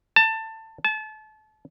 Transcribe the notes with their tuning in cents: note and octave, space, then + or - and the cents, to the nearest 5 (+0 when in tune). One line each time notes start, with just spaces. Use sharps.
A5 +20
A5 -30